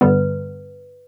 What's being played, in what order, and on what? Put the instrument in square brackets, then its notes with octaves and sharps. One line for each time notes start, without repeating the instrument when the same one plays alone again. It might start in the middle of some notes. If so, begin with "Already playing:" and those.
[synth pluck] G2 D3 G3 B3 [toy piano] B4